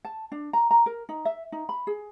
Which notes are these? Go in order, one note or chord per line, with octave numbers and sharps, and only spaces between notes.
A5
D4
A#5
A#5
A#4
D#4
E5
D#4
B5
G#4